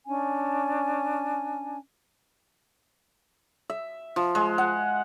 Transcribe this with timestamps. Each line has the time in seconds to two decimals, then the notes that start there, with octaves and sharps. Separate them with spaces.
0.07 C#4 D4 G#5
3.70 E5
4.16 F3
4.35 G#3
4.58 F#5